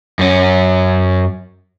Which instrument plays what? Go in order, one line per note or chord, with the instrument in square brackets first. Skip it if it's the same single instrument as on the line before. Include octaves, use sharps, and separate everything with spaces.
[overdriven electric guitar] F#2 C#4